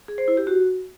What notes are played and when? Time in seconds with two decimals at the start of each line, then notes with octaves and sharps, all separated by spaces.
0.08 G#4
0.18 C5
0.28 E4
0.37 G4
0.47 F#4